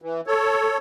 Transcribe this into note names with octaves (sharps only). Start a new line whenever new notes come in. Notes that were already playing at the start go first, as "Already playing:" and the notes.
E3
A4 C#5